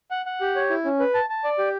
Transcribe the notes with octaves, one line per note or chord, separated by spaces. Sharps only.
F#5
F#5
G4
C#5
E4
C#4
B4
A5
A5
D5
G4